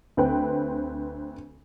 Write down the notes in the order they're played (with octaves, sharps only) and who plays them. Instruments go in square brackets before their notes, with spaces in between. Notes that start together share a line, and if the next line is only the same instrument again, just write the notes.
[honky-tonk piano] D2 C4 B4 G5